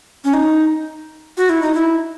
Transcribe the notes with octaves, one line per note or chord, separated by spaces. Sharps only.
C#4
D#4
F#4
E4
D#4
E4